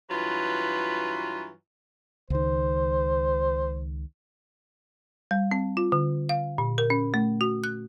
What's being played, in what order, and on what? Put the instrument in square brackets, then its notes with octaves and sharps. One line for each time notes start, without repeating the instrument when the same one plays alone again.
[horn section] G2 E3 F#3 F4 B4
[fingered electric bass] C#2 D#3 [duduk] C5
[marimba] G3
C4
F4
D3
F5
A#2
A#4
C#4
A3
F#4
F#6